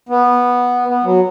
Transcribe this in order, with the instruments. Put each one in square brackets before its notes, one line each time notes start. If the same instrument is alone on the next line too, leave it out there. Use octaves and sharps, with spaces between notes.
[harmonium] B3
B3
F#3